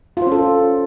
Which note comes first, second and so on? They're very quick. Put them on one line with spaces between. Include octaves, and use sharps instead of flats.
F4 C5 C#4 A4